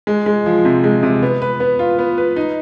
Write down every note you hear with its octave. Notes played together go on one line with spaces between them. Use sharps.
G#3
G#3
F3
C3
G#3
C3
B3
B4
B3
F4
B3
B4
D#4